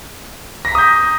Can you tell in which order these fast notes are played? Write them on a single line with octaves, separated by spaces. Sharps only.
A#6 B6 A#5 D#6 G6